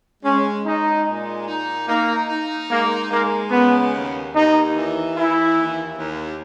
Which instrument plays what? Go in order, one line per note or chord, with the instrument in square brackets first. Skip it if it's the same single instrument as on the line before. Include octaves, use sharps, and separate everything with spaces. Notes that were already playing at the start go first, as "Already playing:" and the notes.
[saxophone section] G#3 [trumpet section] C#4
[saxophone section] G#3 [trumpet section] D#4
[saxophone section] A#2
D#4
[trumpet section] A#3 [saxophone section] D#4
[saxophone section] D#4
[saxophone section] G#3 [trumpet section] A#3
[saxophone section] G#3 [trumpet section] A#3
[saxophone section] C#3 [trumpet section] B3
[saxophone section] D#2
[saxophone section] D#2 [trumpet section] D#4
[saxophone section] E3
[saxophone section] E3 [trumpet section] E4
[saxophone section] D#2
D#2